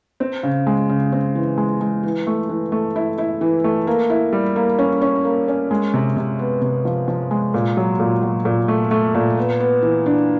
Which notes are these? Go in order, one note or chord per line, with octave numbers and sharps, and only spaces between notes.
C4
C#3
G#3
C#3
C4
E3
G#3
G#3
E3
A3
E3
A3
E4
E4
E3
A3
A#3
E4
G3
A#3
C#4
C#4
A#3
C#4
G#3
C3
C3
B3
C3
F3
F3
G#3
A#2
F#3
A#2
F#3
A#2
A3
A3
A#2
B3
B3
E3
D4